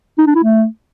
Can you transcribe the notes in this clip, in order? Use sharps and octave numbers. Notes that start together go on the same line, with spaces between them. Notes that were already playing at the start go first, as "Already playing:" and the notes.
D#4
D4
E4
A3